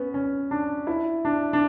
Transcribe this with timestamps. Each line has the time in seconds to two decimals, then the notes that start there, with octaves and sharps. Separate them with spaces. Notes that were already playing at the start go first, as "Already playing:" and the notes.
Already playing: B3 C#4
0.14 C#4
0.51 D4
0.87 E4
1.25 D4
1.53 D4